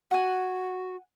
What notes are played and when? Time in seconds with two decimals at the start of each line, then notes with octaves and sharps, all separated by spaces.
0.11 F#4 F#5 G#5